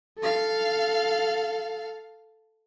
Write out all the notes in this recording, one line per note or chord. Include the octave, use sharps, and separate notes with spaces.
A4 F5